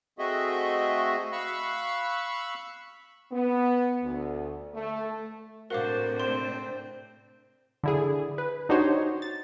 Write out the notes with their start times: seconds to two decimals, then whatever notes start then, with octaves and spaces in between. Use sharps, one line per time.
0.19 A3 C4 F#4 G#4 D#5 E5
1.32 F5 B5 C#6 E6 F#6
3.32 B3
4.03 D2
4.74 A3
5.70 A2 C3 D4 F#4 A#4 C5 F5 D6
6.20 C4 C6
7.83 D3 E4 G#4
8.38 B4
8.69 D4 D#4 F#4 G4 C5 C#5
9.22 A6